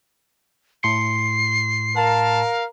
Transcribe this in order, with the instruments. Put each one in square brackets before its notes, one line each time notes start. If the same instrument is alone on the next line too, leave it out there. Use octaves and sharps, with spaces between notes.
[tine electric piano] A2 C6 C#7 [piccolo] C7
[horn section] A#4 F5 [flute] A5